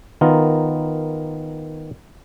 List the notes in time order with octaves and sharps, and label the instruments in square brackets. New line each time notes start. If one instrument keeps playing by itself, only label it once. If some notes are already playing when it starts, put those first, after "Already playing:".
[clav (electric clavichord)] D#3 B3 F4 A#4